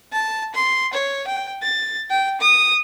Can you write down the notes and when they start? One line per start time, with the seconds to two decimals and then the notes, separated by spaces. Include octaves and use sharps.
0.12 A5
0.54 C6
0.93 C#5
1.27 G5
1.62 A6
2.10 G5
2.41 D#6